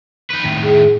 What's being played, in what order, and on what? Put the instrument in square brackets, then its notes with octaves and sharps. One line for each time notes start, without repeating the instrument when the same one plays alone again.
[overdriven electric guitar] D#4 B4
A2 D#3
[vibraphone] G#4